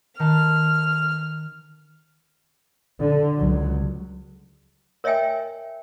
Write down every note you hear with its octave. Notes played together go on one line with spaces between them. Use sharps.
D#3 A5 C6 F6
D3
C#2 F#3
A#4 C#5 D#5 E5 G5 G#5